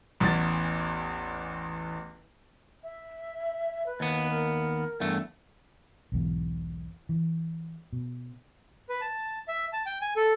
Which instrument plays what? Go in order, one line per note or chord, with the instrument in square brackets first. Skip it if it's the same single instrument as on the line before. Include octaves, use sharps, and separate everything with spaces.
[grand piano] A1 E2 E3 A6
[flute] E5
B4
[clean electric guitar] D#2 B3
[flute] A#4
[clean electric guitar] E2 G2 A3
[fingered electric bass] B1 E2 G#2
E3
B2
[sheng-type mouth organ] B4
A5
E5
A5
G5
G#5
A4